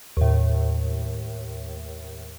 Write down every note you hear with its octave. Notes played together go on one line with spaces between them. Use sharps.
D#2 A2